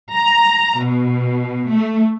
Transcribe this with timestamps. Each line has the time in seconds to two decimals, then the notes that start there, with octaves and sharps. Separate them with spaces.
0.13 A#5
0.82 B2
1.71 A3